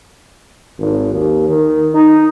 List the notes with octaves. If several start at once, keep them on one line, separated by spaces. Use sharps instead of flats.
G#1
D#2
D#3
D#4